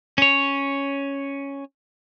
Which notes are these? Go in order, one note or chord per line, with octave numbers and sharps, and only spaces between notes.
C#4 C#5